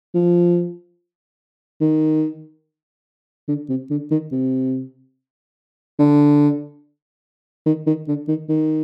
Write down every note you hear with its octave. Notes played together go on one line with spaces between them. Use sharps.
F3
D#3
D3
C3
D3
D#3
C3
D3
D#3
D#3
D3
D#3
D#3